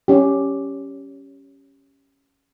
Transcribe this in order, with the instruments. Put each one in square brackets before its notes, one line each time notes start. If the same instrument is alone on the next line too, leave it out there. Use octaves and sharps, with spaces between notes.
[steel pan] C#4 G4